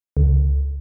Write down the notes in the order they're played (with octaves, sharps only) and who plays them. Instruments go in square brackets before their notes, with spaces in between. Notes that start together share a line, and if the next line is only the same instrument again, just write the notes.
[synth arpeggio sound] C#2